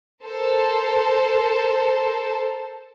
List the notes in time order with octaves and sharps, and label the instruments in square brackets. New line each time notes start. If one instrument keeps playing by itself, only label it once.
[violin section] A4 A#4 C5 A5